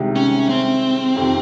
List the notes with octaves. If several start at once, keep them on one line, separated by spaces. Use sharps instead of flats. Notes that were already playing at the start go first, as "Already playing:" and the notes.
Already playing: C2 C3 D#3 G#3
C#4
C4
F2 C3 D#3